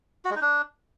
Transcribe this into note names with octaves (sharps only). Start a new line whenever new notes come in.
F#4
G#3
D#4
D4